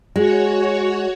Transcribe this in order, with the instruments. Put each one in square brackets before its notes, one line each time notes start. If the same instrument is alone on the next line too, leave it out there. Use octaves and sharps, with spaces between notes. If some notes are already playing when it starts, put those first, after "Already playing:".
[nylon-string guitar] G#3 [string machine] F#4 C#5